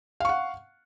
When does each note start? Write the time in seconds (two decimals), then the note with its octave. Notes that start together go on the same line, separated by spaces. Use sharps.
0.20 F5
0.25 C#6
0.29 F#5